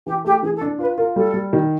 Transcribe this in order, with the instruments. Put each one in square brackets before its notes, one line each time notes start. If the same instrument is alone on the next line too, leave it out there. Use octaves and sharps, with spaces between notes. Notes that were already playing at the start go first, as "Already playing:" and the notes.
[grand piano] E3 [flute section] G4
[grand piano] A3 [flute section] G4
[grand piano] E3 [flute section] G#4
[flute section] A4
[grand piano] D4
[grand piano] F4 [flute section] B4
[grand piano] F4 [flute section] A#4
[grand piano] G3 [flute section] A4
[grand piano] G3
D#3